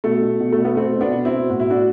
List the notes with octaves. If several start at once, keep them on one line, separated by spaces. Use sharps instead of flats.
B2 A3
B2
B2
A3
B2
B3
B2 A3 C4
B2
B3 D4
B2
C4 E4
B2
A2 F#4
E4
A2 D4 F#4